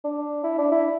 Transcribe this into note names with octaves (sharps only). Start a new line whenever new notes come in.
D4
E4
D4
E4